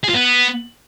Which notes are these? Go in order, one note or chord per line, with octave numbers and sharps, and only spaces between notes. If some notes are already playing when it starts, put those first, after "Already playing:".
G#4
F4
B3